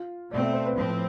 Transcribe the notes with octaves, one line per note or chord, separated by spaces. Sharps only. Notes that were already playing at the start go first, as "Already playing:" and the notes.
Already playing: F4
B2 A3 C4 D5
E5
C5
B4
A2 F3 C4